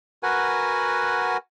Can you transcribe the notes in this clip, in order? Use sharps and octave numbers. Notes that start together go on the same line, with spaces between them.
F#4 A#4 B4 F#5 G#5